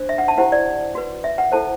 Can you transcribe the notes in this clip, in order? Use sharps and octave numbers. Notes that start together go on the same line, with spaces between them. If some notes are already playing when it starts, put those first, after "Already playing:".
Already playing: D4 C5
E5
F#5
A5
E4 G4 C5 F#5
D5
F#4 B4
E5
F#5
E4 A4 C5 A5